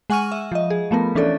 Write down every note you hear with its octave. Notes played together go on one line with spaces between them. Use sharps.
G#3 F#5 G#5 C#6 F6 D#7
E5
F3 D#5
G#4
F3 A3 B3 A#4
E3 C#4 D4 A4 D5